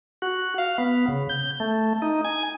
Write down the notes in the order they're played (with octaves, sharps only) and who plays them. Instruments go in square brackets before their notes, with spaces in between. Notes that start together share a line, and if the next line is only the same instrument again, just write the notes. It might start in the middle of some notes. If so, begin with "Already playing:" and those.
[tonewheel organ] F#4
F5
B3
C#3
G6
A3
D#4
G#5